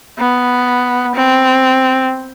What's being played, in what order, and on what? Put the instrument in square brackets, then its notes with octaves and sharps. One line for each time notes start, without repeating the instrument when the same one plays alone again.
[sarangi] B3
C4